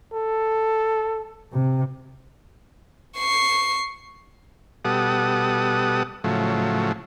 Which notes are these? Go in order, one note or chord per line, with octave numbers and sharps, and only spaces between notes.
A4
C3
C#6 C7
B2 G3 A4 F#5 D#6
A2 C#3 F3 F#3 A3